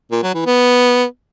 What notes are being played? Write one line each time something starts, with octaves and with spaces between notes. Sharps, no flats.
A#2
F#3
E3
B3